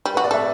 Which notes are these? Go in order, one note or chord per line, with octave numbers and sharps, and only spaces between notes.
G3
F#4 B4
D5
A4 E5